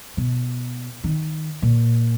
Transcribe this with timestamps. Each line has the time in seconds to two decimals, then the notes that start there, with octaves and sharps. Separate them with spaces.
0.17 B2
1.04 D#3
1.62 A#2